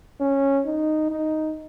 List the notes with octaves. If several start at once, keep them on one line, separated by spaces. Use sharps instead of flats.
C#4
D#4
D#4